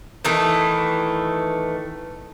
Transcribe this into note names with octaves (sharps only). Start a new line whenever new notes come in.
D#3 E3 A3